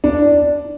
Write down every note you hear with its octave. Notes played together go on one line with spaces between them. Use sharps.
D4